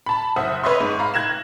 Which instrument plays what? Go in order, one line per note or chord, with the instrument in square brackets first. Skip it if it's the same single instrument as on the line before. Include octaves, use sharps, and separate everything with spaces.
[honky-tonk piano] A5 B5
F#1 C5 E5 F#5 D#6
B4 C#5 D#5 E5 C6
G#2
F5 A#5 B5
F#6 G#6 A#6 E7